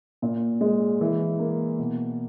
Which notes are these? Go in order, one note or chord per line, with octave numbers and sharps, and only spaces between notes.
A#2
G#3
E3
A#3
B2